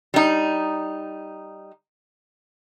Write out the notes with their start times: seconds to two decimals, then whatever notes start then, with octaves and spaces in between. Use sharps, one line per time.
0.14 G3 D#4